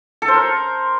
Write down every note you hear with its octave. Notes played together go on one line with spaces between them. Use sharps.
A4
C5
A#4